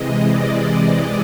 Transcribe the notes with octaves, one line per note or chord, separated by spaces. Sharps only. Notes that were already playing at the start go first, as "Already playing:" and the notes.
Already playing: C3 E3 G#3 D#5
D5